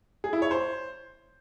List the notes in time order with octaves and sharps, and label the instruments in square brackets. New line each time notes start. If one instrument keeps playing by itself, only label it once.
[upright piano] G#4
E4
C#5
C5